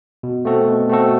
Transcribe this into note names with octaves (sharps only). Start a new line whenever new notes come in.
B2
A3 C4 F#4 A4
B2
A3 C4 F#4 A4